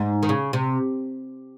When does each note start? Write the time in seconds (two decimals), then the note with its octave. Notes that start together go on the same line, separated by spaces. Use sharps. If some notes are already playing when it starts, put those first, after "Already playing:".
Already playing: G#2
0.23 D#3
0.29 C#3
0.53 C3